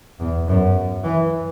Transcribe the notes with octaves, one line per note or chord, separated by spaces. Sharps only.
E2
F#2
E3